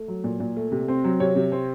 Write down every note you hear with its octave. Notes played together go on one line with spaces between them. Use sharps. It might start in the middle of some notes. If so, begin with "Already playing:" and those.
Already playing: A3
F#3
A#2
A#2
A3
C3
C4
F#3
C3 C#5
C3
C4